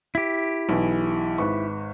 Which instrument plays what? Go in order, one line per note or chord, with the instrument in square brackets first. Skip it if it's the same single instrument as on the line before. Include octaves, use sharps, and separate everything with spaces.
[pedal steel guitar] E4 G4
[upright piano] B1 E3
G#1 B4 C#6